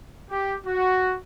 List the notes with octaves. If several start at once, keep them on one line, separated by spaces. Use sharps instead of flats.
G4
F#4